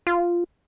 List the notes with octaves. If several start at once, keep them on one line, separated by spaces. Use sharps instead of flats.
F4